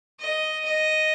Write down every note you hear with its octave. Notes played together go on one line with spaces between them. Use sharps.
D#5
D#5